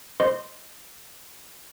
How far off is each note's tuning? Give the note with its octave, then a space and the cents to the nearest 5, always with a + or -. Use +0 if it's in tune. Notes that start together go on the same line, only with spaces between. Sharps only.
C5 +0 D#5 -10 C6 +0